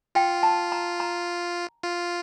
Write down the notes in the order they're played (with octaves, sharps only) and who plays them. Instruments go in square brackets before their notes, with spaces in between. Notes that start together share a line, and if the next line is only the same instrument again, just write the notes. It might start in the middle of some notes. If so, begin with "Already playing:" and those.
[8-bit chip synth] F4 [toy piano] G5
[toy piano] A5
A#5
A#5
[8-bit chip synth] F4